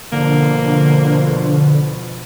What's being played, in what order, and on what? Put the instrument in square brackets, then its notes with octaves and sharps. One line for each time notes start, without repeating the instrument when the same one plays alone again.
[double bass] B2 F3 [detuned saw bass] D3 [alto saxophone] A#3